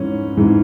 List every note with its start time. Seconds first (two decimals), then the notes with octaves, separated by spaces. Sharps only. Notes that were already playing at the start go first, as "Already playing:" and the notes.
Already playing: G#2 E3 C#4
0.37 G#2 E3